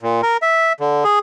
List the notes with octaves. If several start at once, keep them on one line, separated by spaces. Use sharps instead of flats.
A#2
A#4
E5
D3
G#4